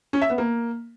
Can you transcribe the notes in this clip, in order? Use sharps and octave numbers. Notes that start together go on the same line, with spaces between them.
C#4
E5
B3
A#3